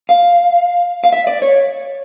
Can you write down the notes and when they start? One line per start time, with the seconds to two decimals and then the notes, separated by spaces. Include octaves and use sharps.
0.09 F5
1.04 F5
1.12 E5
1.27 D5
1.42 C#5